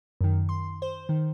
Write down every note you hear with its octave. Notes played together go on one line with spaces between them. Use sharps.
F#2 D#3
C6
C5
D#3